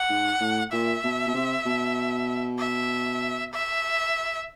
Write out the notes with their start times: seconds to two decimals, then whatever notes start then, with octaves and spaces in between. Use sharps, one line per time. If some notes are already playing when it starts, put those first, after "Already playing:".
Already playing: F#5
0.09 G#2
0.40 A2
0.72 A#2 E5
1.04 B2
1.27 B2
1.34 C3
1.66 B2
2.59 E5
3.53 E5